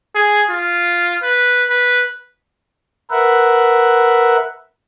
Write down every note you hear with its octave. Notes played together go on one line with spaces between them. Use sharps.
G#4
F4
B4
B4
A#4 B4 E5 F#5